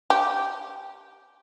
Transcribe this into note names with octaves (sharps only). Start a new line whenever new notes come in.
G4